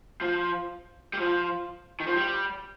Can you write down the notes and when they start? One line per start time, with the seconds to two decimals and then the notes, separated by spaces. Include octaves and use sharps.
0.21 F3
1.13 G3
1.18 F3
2.00 D#3
2.07 F3
2.15 G3